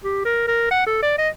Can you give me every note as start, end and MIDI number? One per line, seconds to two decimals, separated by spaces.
0.04 0.25 67
0.25 0.45 70
0.48 0.69 70
0.71 0.84 78
0.87 1.01 69
1.02 1.17 74
1.18 1.29 75